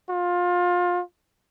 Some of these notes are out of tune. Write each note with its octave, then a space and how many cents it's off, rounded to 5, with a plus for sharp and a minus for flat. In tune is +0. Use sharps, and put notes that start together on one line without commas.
F4 +25